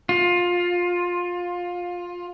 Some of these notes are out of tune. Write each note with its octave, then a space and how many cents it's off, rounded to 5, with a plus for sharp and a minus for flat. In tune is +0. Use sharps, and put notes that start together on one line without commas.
F4 +15